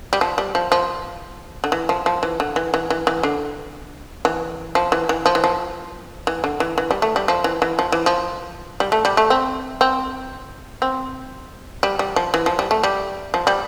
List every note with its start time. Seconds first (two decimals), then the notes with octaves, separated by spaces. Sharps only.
0.13 G3
0.21 F3
0.38 G3
0.55 F3
0.72 F3
1.64 D3
1.72 E3
1.89 F3
2.06 F3
2.23 E3
2.40 D3
2.56 E3
2.74 E3
2.90 E3
3.07 E3
3.23 D3
4.25 E3
4.75 F3
4.92 E3
5.09 E3
5.26 F3
5.35 E3
5.44 F3
6.27 E3
6.44 D3
6.60 E3
6.78 E3
6.91 G3
7.02 A3
7.16 G3
7.28 F3
7.44 E3
7.62 E3
7.79 F3
7.92 E3
8.06 F3
8.80 G3
8.92 A3
9.05 G3
9.17 A3
9.30 C4
9.81 C4
10.82 C4
11.83 G3
11.99 G3
12.16 F3
12.34 E3
12.46 F3
12.59 G3
12.71 A3
12.83 G3
13.34 F3
13.47 G3